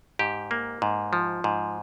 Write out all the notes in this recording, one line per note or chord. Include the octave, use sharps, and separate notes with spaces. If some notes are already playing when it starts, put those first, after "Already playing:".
G#2 G4
A#3
G#2
F3
G#2